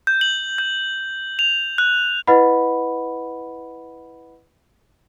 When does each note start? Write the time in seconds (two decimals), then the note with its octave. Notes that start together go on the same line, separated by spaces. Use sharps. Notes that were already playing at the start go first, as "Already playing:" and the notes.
0.07 G6
0.21 F#7
0.58 G6
1.39 F7
1.78 F#6
2.27 E4 B4 D#5 F#5 B5